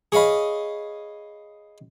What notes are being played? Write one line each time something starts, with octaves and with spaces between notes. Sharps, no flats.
G#4 C#5 D#5 F5 B5